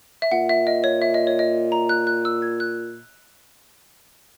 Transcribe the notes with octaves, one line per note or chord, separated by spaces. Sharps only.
E5
A#2 F#5
E5
D#5
C#5
E5
D#5
C#5
D#5
A#5
F#6
F#6
E6
G#6
F#6